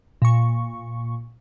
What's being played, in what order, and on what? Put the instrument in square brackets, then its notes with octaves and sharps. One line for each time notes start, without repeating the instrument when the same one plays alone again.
[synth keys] A#2 C#6